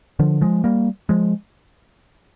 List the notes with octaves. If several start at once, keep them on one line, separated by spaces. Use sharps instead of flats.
D3 F3
F3 G#3
G3 A#3
F3 G#3